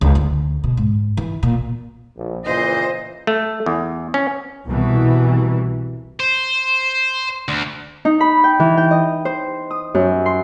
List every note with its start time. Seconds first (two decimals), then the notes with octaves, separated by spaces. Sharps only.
0.01 C#2
0.15 D2
0.64 B2
0.77 G#2
1.17 E3
1.43 A#2
2.17 A#1
2.46 A#2 C#3 E3 C5 D#5
3.27 A3
3.66 E2
4.14 C#4
4.67 C2 B2 E3
6.20 C5
7.48 D2
8.05 D#4
8.20 B5
8.44 G5
8.60 E3
8.77 G5
8.91 D#5
9.25 C5
9.71 D#6
9.95 F#2
10.26 C6